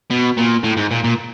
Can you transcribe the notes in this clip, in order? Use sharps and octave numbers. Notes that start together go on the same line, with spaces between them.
B2
A#2
A2
G#2
A#2
A#2